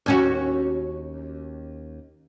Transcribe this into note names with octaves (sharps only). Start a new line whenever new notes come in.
D#2 C#4 F#4